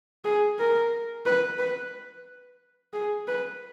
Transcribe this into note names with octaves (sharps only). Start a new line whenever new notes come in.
G#4
A#4
B4
B4
G#4
B4